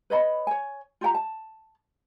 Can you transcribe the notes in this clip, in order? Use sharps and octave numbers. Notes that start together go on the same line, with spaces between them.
B4 C#5 D#5 B5
C#5 G#5
F4 G4 G5 A#5
A5